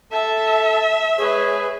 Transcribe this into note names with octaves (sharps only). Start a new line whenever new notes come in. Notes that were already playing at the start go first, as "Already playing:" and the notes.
A4 E5 A5
G#3 G#4 B4 C#5